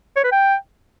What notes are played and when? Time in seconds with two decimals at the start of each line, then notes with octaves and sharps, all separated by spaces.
0.16 C#5
0.24 B4
0.32 G5